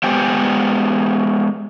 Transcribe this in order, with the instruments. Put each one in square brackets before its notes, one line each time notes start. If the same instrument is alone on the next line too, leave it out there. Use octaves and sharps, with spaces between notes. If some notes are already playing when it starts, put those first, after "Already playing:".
[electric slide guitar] G#3 B3 G4 C5 G5 G#5